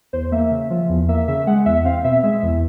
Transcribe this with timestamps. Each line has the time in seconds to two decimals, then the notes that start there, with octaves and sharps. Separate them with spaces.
0.13 E2 C5
0.32 A#3 E5
0.51 C#3
0.70 F3
0.89 E2
1.09 A#3 E5
1.28 C#3 E5
1.47 G#3 F#5
1.66 E2 E5
1.85 C4 F5
2.04 B2 E5
2.23 G#3 E5
2.43 E2